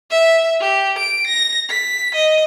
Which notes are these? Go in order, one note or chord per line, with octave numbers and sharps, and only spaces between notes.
E5
G4
D7
A#6
B6
D#5